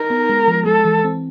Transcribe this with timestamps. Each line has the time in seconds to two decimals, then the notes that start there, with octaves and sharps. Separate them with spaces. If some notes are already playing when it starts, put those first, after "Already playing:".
Already playing: D#4 A#4
0.10 B3
0.30 G#3
0.48 F3
0.66 G#3 A4
0.85 E3
1.04 C4